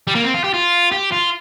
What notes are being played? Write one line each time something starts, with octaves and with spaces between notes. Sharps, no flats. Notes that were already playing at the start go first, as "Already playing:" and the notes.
G3
A#3
C4
F4
G4
F4
G4
F4